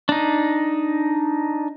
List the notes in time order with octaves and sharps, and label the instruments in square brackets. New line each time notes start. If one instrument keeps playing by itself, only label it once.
[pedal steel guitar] D4 D#4